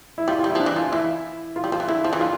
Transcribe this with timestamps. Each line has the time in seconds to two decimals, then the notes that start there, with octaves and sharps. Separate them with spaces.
0.18 E4
0.28 G3 F4
0.39 G3 F4
0.50 E4
0.55 F3 D4
0.66 E3
0.76 F3 F4
0.92 E3 E4
1.56 F4
1.64 G3
1.72 F3 F4
1.80 E3
1.88 D3 E4
2.04 F3 F4
2.13 E3
2.19 D3 F4